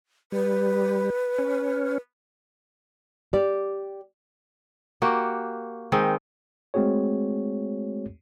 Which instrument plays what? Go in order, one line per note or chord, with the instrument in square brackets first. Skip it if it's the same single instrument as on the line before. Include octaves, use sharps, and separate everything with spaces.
[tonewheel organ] G3 [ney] B4
[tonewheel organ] C#4
[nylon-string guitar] G4 D5
[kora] A#3 F#4 G4
D#3 G#3 C4
[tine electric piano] G#3 A3 C4 F#4 G#4 C#5